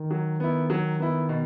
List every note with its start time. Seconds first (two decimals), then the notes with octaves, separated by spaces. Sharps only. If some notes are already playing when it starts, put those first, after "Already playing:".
Already playing: D#3
0.11 F#3
0.40 B3 E4
0.70 F#3
1.00 B3 E4
1.29 B2